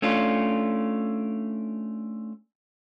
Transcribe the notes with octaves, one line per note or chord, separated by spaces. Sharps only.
A3 C#4 D4 F4